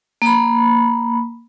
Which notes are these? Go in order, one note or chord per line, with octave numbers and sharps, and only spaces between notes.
A#3 B5